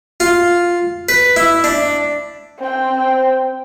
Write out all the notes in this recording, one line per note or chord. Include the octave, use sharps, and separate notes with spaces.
F4
B4
E4
D4
C4 C5 G5